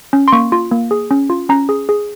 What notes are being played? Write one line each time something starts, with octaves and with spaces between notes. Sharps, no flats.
C#4
C6
A#3 C#6
F4
A#3
G#4
C#4
F4
C#4 A#5
G#4
G#4